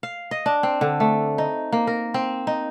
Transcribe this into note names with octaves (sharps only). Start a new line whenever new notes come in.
F5
D#5
D4
C4
D3
A3
D#4
A#3
A#4
C4
D#4